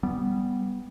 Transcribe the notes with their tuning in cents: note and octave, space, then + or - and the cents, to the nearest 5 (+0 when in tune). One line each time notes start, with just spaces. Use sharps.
G3 +0 B3 +0